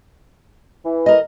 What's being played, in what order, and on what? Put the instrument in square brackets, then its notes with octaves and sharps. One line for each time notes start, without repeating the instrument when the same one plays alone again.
[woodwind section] E3
[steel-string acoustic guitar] A#4 D#5